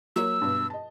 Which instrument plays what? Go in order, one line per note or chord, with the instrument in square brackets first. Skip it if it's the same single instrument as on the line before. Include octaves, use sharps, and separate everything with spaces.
[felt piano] F#3 A#3 C#5 [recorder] E6
[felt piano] G2 B2
D#5 A5